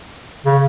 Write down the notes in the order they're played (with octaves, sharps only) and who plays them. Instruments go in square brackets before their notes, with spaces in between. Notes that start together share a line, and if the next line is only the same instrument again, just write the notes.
[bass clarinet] C#3